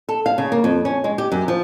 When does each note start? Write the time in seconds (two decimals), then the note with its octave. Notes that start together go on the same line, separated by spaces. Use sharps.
0.09 A4
0.26 F5
0.38 C#3
0.52 A#3
0.64 F2
0.85 C#4
1.04 G#3
1.18 G4
1.32 F#2
1.48 F3